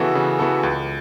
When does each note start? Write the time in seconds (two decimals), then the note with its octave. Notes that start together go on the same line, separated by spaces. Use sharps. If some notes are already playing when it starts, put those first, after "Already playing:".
Already playing: C#3 E3 B3 F#4 A4
0.15 C#3
0.39 E3 B3 F#4 A4
0.63 C#2